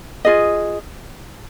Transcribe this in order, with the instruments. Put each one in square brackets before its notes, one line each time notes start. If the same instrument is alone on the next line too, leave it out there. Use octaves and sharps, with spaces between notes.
[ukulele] F4 G#4 D#5